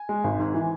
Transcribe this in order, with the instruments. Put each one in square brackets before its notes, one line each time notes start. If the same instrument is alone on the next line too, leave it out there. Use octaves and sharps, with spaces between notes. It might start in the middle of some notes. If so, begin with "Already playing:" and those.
Already playing: [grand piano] G#5
G#3
G#1
G#2
E3